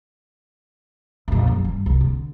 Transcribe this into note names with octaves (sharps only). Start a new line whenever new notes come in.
A#1 F2
F#2 F#3
G2
C2
D3